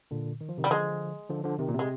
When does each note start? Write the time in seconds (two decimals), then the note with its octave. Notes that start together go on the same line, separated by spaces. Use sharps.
0.11 A#2 D3
0.41 D#3
0.49 F3
0.58 C3 D#3
0.64 G3
0.70 D3 F3 G#3
1.30 D3 F3
1.44 D3 F3
1.59 C3 D#3
1.69 A#2
1.74 C3 G#3